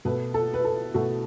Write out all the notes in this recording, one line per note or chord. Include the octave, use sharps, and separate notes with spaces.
B2 A3 B4
A4
B4
A4
B2 A3 F#4